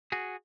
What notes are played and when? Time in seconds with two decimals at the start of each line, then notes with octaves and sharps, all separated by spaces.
0.12 F#4 G#4